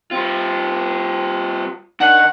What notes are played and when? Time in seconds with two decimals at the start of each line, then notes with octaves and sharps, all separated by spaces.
0.11 G3 C4 F4
2.00 D#3 D4 F#5